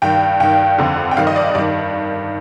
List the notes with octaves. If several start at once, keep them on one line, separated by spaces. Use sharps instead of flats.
G2 D#3 G5
G2 D#3 G5
F2 D3
G5
G2 D#3 F5
D#5
D5
G2 D#3 D5